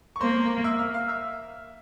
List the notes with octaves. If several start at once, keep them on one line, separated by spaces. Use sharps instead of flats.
C#6
A#3 C5 C6
E5 E6
F5 F6
F5 F6
E5 E6